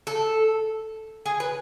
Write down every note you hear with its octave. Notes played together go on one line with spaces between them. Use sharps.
A4
G#4
B4